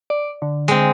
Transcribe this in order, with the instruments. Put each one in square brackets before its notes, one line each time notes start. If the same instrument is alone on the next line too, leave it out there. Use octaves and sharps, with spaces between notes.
[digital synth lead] D5
D3
[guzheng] G#3 C4